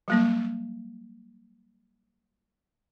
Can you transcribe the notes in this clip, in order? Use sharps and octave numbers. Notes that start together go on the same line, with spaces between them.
F#3 G3 A#3